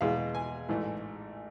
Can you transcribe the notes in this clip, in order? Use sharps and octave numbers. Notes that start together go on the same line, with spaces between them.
E2 B2 G#3 F5
G#5
A1 G#2 E3 A3